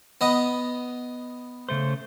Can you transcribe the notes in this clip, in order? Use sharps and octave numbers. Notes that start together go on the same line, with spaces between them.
B3 D#5 F#5
C#3 A3 C5